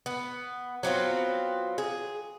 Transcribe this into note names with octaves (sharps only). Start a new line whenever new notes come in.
B3
F#3 B3 C4 F4
G#4